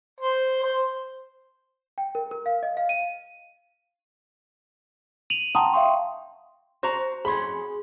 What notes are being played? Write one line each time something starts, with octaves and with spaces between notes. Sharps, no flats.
C5
C5
G5
A#4
A#4
F5
D#5
F5
D#7
D#7 F7 F#7
F#5 G5 A5 A#5 C6 D#6
E5 F5 G5 C6 C#6
F#4 C5 A#5
F2 C#4 G#4 B5 C6